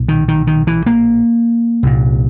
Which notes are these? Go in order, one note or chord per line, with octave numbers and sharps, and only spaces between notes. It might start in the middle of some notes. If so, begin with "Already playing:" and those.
Already playing: B1 A#2
D#3
D#3
D#3
E3
A#3
C2 A#2